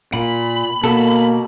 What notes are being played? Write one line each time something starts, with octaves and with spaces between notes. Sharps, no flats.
A#2 B5
B2 A#3 A4